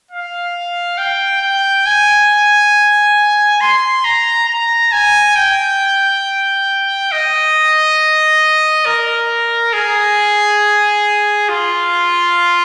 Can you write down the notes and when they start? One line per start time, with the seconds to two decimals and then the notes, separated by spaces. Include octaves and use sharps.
0.11 F5
0.98 G5
1.42 G5
1.86 G#5
3.61 C6
4.04 A#5
4.48 A#5
4.92 G#5
5.36 G5
7.12 D#5
8.86 A#4
9.73 G#4
11.49 F4